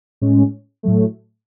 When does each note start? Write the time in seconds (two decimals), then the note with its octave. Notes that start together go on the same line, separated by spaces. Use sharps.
0.21 A2 G#3 C#4
0.83 A2 F#3 A3